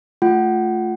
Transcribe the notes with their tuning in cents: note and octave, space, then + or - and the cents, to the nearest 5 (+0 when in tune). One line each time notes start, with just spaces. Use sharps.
A3 +0 F4 +0 F#5 +30